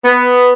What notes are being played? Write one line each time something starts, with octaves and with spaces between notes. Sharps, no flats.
B3